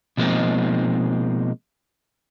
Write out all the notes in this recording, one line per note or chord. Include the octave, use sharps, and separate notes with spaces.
B2 F3 G#3 A#3 C4 D#4